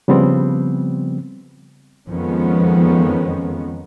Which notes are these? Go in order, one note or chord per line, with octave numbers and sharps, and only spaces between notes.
C#3 F3 G3 B3 C4
F2 D#3 F3 G#3 B3 C#4